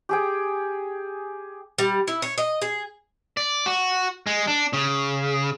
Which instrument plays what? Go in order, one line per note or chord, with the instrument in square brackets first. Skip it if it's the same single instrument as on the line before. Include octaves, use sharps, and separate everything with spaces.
[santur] G4 G#4 G5
[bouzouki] G3
E4
C#5
D#5
G#4
[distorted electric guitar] D5
F#4
G#3
D4
C#3